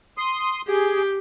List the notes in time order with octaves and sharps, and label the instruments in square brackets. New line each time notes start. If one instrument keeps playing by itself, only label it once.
[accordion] C6 D#6
[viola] G4 [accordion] G#4